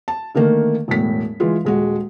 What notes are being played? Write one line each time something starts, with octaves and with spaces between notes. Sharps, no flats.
A5
D3 D#3 A3 A#3
E1 E2 A2 B6
E3 G#3 F4
D#1 G#3 F#4